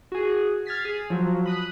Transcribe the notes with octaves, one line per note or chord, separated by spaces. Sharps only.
F#4 G#4
F6 G#6 A6 B6 C7
G#4
F3 F#3
B5 D#6 F#6